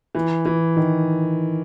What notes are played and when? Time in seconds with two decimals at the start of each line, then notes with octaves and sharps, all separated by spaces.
0.15 E3
0.46 E3
0.77 D#3